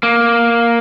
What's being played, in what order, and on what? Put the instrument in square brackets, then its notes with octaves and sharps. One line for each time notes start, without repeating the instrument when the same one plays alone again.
[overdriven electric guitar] A#3